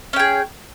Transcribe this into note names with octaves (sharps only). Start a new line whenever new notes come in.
C#4 G#4 G5